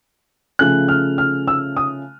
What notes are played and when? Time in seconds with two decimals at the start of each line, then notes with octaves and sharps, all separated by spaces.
0.59 C#3 F3 A3 C#4 F#6
0.88 F6
1.18 F6
1.48 E6
1.77 D#6